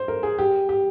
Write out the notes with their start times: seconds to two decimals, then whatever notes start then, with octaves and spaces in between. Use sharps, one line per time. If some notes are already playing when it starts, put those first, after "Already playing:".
Already playing: C5
0.08 A#4
0.23 G#4
0.39 G4
0.69 G4